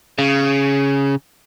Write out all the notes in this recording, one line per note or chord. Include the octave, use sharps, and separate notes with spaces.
C#3